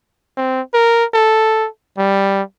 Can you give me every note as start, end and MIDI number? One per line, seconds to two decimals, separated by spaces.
0.37 0.61 60
0.74 1.05 70
1.14 1.68 69
1.98 2.42 55